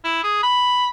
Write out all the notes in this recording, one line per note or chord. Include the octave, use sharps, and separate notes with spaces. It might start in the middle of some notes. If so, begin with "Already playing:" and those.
E4
G#4
B5